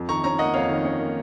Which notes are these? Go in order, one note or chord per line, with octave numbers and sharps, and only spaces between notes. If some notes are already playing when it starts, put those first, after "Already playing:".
Already playing: F2
D#3 A#5 C#6
C#4 A#5 C#6
A#3 D#5 F#5
F2 C#5 F5
D#3
C#4
A#3